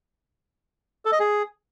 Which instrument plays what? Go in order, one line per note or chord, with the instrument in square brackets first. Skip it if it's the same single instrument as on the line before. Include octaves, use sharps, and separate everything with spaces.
[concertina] A4
D#5
G#4